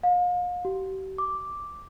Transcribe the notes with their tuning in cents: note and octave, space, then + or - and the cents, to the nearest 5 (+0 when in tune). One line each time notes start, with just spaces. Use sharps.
F5 +40
G4 -40
D6 +0